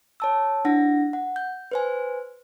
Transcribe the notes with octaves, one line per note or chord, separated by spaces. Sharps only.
C#5 A5 E6
D4 E4 F#5 A#6
F#5
G6
B4 C5 G#5